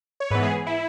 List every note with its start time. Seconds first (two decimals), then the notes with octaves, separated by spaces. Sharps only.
0.20 C#5
0.30 G#2 E3 B3 B4
0.43 G#4
0.67 E4